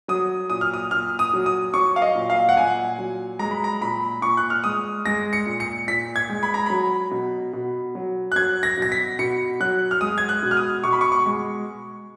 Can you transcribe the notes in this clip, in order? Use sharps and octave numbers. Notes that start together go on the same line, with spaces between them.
F#3 D#6
A#2 D#6
F6
D#6
A#2 F6
D#6
F#3
D#6
F#3 C#6
F5
D#5
A#2
F5
F#5
A#2 G#5
F#3
G#3 A#5
B5
A#5
A#2 B5
A#2 C#6
F#6
F6
G#3 D#6
G#3 A#6
C#7
A#2
C#7
A#2 B6
G#6
G#3
B5
A#5
F#3 B5
B2
B2
F#3
F#6
F#3 G#6
A#6
B2 A#6
B6
B2 C#7
F#3 F#6
F6
G#3 D#6
G#6
F#6
B2
F6
D#6
B2 C#6
B5
C#6
C#6
G#3